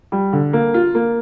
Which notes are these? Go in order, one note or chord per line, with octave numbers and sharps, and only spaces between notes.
G3
D3
A#3
F4
A#3